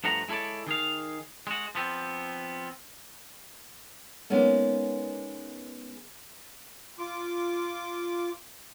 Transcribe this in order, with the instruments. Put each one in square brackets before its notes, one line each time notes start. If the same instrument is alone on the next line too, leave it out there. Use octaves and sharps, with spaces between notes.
[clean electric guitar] G2 F3 A3 F#5 A#5
G#3 E4 A4 C#5 D5
D#3 G#4 F5
G#3 F#4
F3 B3 C4
[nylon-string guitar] G#3 A#3 B3 C#4 D#4
[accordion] F4 D6